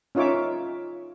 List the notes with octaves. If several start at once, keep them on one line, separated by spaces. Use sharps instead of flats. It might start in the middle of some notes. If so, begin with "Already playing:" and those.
C#4 D#4 F4 C#5 E5 D6